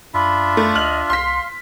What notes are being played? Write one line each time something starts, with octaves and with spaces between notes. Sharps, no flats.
F#2 D4 F4 E5 B5
A3
D2 D#5 F6 F#7
C2 F5 C6 B6